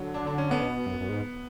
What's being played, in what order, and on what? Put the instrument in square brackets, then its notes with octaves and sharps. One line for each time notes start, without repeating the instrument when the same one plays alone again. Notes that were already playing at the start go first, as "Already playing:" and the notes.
Already playing: [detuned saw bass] D3 [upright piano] F#3
[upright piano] D4
D4
C#4
B3
[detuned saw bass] B2
F#2
F#2
G#2